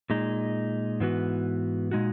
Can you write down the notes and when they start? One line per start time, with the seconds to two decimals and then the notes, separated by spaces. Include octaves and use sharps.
0.10 A#2 G#3 D#4
1.00 G#2 E3 B3 F#4
1.91 A#2 G#3 D#4 F#4